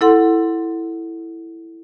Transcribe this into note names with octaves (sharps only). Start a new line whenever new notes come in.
E4 A4 F#5 C6